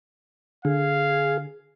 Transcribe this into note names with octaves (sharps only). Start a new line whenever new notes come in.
D3 G#4 F5